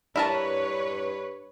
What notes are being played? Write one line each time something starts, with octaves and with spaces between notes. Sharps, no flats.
G2 D4 E4 A#4 B4 C#5 A5